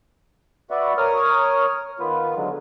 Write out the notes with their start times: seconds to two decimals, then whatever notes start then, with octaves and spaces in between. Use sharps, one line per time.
0.71 F#4 B4 D5 E5 F#5
0.98 A#4 C#5 D#6 F6
1.99 D#3 B3 F4 B4
2.36 D3 F#3 G#3